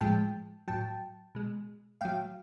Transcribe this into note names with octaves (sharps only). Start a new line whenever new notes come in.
A2 F3 G#3 G5 A5
A2 F#3 G5 A5
B2 G#3
A2 F#3 F5 G5